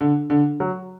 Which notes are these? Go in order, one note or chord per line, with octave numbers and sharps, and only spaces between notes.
D3
D3
F#3